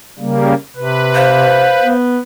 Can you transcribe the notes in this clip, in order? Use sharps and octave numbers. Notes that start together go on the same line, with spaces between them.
C#3 G3 A#3
C3 B4
C5 F5
B3